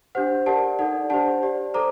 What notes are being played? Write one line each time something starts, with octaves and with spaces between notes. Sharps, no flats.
D4 G4 C5 F#5
G4 A#4 D5 F#5 A5
D#4 A4 D5 F#5
D4 G4 C5 F#5 A5
G4 D5
A4 C5 A#5 D6